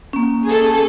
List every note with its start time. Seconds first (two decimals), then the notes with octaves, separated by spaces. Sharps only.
0.13 A#3 C#4
0.45 G#4 A4